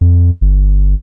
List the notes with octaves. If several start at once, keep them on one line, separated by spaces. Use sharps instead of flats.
F2
G1